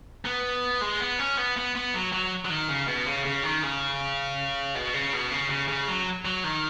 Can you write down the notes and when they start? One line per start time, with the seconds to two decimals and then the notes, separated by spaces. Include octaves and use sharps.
0.25 B3
0.81 G#3
1.00 B3
1.19 C#4
1.37 B3
1.56 B3
1.75 B3
1.94 F#3
2.12 F#3
2.45 F#3
2.50 D#3
2.69 C#3
2.87 B2
3.06 C#3
3.25 C#3
3.43 D#3
3.63 C#3
4.75 B2
4.94 C#3
5.13 B2
5.31 C#3
5.50 C#3
5.68 C#3
5.87 F#3
6.25 F#3
6.44 D#3